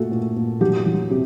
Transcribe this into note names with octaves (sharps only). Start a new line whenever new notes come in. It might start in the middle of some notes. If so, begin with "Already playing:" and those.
Already playing: A#2 A3 F#4 A4
A#2
A#2
F#3 G4
F#3
C3 G4